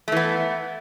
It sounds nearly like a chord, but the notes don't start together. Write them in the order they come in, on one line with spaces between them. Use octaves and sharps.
A3 E3 B3